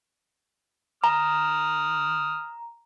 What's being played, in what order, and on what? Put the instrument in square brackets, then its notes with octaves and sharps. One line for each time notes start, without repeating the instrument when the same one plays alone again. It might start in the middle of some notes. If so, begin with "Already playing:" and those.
[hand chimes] A#5 [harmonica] D#6 F6